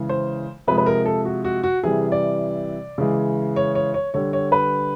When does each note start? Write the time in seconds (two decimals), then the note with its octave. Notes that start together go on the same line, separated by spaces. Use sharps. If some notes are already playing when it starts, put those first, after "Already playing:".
Already playing: C#3 E3 G#3
0.09 C5
0.67 C3 F3 G#3 B4
0.78 B4
0.86 A#4
1.05 A4
1.25 F#4
1.44 F#4
1.63 F#4
1.83 C3 E3 G3 G#4
2.12 D5
2.98 C#3 E3 G#3
3.56 C#5
3.75 C#5
3.94 C#5
4.14 D3 G3 C#5
4.33 C#5
4.52 B4